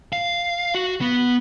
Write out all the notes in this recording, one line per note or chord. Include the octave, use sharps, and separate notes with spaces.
F5
F#4
B3